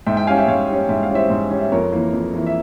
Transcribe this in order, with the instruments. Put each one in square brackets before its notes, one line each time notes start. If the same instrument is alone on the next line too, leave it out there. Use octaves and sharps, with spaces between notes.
[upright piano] G#2 E5 G5
E5 G5
G3 C#4 F5 G#5
E5 G5
G#2 C#5 F5
G3 C#4
G#2 E5
F5
G3 C#4
C5 E5
G#2
G3 C#4
E5
F2 A#4 C#5
E3 A#3
F2
E3 A#3
E5